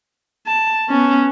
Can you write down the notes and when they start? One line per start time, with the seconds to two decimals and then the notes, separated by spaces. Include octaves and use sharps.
0.46 A5
0.88 B3 C#4